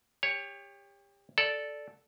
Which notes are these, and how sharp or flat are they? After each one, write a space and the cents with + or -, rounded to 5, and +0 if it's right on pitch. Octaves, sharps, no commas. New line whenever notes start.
G4 +30 C#5 +0
A4 -5 D5 +0